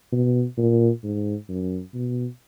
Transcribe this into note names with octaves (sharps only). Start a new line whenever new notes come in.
B2
A#2
G#2
F#2
B2